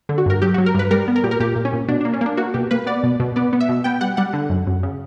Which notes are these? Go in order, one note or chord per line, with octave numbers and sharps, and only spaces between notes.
D3
F#4
G2 A#4
F#3 G4
F#4
F#3
A#4
G2 B4
G3 A#4
B3
A#4
A#2 G4
A#4
A#2 G4
A#2
C#4
A#2
B2 D4
D4
A#3
C#4
A#3 D4
A#3 F#4
B2 G4
A#3 B4
B3 D5
B2
B2
B3 D5
B3
E5
B2
B3 G5
G3 F#5
G3 F#5
D3
F#2
F#2
C#3